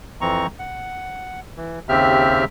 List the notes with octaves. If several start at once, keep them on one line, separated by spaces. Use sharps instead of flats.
F2 E3 C4 A#5 C#6
F#5
E3
D#2 C#3 C4 G4 E5 F6